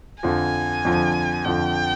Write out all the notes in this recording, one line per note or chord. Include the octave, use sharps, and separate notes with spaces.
F2 D3 F3 G#5
F2 D3 F3
F2 D3 F3 G5